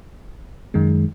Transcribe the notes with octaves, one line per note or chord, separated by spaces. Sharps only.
F#2 D#3 G#3